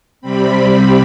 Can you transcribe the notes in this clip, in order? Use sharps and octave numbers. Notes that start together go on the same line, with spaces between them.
C3 G3 C4 B5